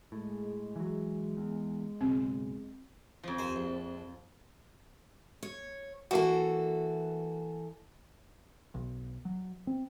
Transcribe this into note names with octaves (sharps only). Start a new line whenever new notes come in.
A2 G#3
E3 F#3
E2
F#1 B1 C4
F2 F3
D#2 C5 G#5
A#1
C#5
E3 A#3 F#4 A4
B1
F#3
C4